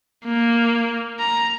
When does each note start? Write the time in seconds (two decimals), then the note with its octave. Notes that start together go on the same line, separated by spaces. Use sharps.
0.25 A#3
1.20 A#5